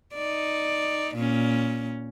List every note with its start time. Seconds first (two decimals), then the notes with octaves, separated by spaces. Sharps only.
0.14 D#4 D5
1.15 A#2 C#4